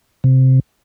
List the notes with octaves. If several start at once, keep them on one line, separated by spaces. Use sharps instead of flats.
C3